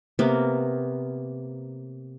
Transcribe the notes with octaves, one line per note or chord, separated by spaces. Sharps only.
C3 A#3 B3